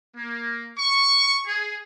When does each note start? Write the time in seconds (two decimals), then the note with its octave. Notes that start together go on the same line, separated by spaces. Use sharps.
0.16 A#3
0.77 C#6
1.47 G#4